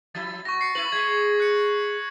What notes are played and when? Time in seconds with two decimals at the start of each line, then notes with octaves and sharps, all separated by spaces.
0.15 F3 E4 A6
0.45 F#4 C#6 A#6
0.61 C7 C#7
0.75 E4 B4 F#7
0.92 G#3 G#4 G#6 B6
1.40 F#6 C#7